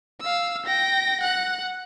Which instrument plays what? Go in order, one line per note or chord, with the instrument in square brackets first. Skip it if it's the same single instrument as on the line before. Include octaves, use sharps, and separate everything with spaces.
[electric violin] F5 E6
G5 A#6
F#5 F#6